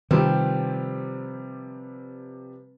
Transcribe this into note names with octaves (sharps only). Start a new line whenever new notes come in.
C3 D#3 F3 G3 C4 B4